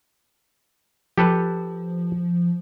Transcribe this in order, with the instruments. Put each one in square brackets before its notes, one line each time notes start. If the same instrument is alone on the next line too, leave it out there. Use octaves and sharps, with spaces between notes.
[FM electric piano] F3 [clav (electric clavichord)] G4 A4 B4